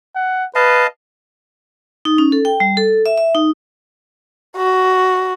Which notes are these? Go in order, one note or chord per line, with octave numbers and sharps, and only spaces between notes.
F#5
B4 D#5 F5 A5
D#4
C#4
A4
G5
G3
A4
E5
E5
D#4
F#4